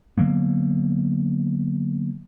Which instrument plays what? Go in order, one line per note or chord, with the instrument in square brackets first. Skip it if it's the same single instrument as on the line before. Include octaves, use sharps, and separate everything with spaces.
[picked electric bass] D3 F#3 A#3 B3